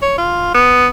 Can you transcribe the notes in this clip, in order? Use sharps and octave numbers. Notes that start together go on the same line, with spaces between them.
C#5
F4
B3